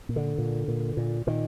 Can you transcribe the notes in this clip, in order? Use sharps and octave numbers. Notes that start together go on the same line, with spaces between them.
A#2
D3
A#2
A#2
A#2
A#2 D#3